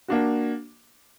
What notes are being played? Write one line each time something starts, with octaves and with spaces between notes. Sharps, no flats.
A#3 D4 F#4